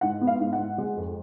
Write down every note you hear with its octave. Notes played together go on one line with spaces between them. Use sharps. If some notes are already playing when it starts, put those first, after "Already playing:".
G#2 F#5
B3
F5
G#2
F#5
G#2
G#3
F2